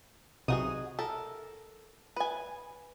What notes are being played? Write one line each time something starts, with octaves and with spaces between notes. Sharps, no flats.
B1 C3 D#4 F#4 G#4 D#6
A4 A#4 E5
B4 G#5